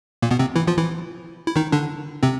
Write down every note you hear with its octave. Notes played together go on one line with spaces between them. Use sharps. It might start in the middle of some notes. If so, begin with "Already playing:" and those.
A#2 A#3
B2 B3
C3 C4
E3 E4
F3 F4
E3 E4
E4
D#3 D#4
D3 D4
C3 C4